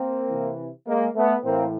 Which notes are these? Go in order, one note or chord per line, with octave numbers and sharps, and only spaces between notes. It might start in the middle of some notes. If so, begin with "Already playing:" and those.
Already playing: A#3 C4
C3 E3
G#3 A#3
A3 B3
A2 E3 A#3 C4